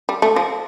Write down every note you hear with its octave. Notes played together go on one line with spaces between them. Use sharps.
G3
A3
F3